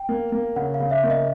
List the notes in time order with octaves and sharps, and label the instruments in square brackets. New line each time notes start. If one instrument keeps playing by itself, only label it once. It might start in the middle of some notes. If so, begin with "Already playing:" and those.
Already playing: [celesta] G5
[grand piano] A#3
A#3
[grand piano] C#3 [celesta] F#5
[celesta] F5
[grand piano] C#3
[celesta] E5
[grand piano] A#3
[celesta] D#5